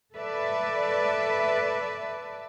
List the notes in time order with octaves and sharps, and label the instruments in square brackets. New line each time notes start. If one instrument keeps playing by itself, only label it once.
[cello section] A4 B4 D5 E5